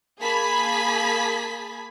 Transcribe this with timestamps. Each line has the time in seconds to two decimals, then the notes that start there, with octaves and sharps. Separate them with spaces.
0.20 A#3 G#4 A5 B5 G#6 B6